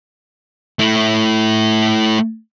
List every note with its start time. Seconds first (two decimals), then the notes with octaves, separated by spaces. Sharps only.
0.79 A3 E4